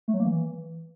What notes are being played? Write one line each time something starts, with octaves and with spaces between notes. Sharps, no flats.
A3
F#3
A#3
E3